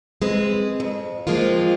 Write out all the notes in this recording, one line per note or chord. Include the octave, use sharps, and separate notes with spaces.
G#3 C4 B4
F2
F3 G#3 A#3 C4 F4